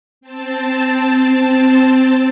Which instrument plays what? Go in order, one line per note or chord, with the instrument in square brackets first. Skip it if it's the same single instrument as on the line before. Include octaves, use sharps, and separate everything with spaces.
[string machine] C4 A5